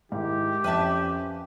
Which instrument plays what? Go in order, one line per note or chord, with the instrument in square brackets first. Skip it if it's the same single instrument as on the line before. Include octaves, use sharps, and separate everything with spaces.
[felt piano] G#2 [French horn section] D#3 E4 [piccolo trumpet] G4
[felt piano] F2 [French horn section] F3 C#4 [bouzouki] B4 E5 A5